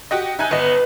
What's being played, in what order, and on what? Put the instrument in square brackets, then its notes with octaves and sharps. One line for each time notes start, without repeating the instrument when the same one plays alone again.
[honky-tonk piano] F#4 G4 D#5
[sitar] D#4 [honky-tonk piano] E5 G#5 F#6
[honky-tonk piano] G1 D#5 [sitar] B3